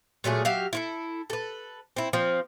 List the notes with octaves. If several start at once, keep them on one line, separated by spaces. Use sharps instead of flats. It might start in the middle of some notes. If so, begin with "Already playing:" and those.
A#2 F#3 A3 G#4
F#3 G4 E5 F5
E4 F4 A4
A4 B4
C4 E4
F3 C4